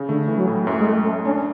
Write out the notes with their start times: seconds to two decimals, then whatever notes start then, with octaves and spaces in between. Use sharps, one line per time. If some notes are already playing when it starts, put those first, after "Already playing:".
Already playing: C#3
0.09 D3 A3
0.28 E3
0.37 F#3
0.47 A2
0.66 F#2 A3
0.80 G#3
0.86 F#2 A3
1.05 F#2 A3
1.25 C#4 D4